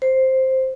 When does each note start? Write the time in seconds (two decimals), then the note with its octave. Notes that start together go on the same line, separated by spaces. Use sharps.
0.02 C5